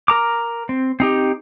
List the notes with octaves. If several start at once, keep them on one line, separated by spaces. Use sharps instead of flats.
A#4 A#5 D6
C4
C4 D#4 G4